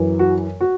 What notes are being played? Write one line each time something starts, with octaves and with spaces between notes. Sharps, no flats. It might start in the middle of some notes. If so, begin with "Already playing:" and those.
Already playing: F#2 E3
F#4
F#4